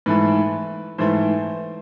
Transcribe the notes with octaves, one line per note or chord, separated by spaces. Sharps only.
G#2 E3 A3 B4
G#2 E3 A3 C5